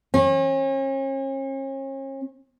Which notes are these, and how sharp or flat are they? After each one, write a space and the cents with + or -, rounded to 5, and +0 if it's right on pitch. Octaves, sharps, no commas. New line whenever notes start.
C#4 -40